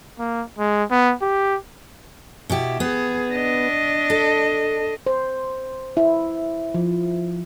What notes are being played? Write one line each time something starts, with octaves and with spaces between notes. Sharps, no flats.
A#3
G#3
B3
G4
B2 E4 G4
B3 G#4
D4 D#5
A4
C5
E4
F3